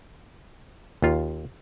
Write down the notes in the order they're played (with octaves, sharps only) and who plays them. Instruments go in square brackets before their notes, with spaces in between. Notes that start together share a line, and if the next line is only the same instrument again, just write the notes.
[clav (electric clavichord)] D#2 F4